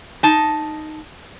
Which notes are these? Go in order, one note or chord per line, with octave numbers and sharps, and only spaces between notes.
D#4 A5